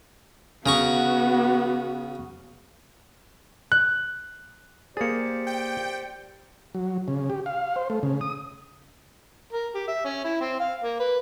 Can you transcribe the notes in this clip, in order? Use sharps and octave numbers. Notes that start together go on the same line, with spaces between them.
C#3 B3 F#4 A#5 C#6
F#6
A#3 G4 G#4 C5 D5 A6 C#7
G5
F#3
C#3
G4
F5
C5
A3
C#3
D#6
A#4
G4
E5
C#4
E4
C4
F5
A#3
B4